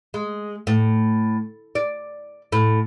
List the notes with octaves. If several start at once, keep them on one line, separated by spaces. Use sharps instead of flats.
G#3
A2
D5
A2